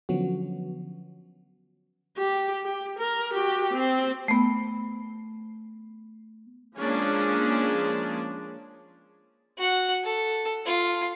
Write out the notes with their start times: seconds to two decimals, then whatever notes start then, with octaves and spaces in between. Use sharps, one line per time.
0.09 D3 F3 F#3 B3 C#4 F#4
2.17 G4
2.63 G4
2.98 A#4
3.32 F#4 G4
3.73 C4
4.28 A3 B3
6.78 F3 G#3 A#3 C#4 D4 G#4
9.58 F#4 F#5
10.04 A4
10.66 F4